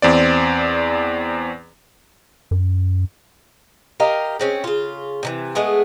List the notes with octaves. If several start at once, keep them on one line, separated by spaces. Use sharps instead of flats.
E2 C4 D5
F#2
G4 A#4 D#5 F5
G#3 C4 C#4
C#3 F4
C3 D#3 E3
G#3 A3 B3 G#4